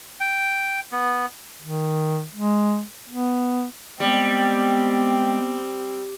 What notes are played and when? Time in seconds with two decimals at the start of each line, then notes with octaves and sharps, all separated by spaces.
0.20 G5
0.92 B3
1.62 D#3
2.34 G#3
3.09 B3
4.00 G3 G#3 B3 C4 G5